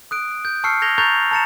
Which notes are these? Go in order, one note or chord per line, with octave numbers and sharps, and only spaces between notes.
D#6 F#6 D7
G6
A5 C#6 E6 F6 C7 C#7
G6 G#6 A#6 F7 G7
A#5 C#6 F#6 G6 A6 F7
A5 A#5 A6 C#7 E7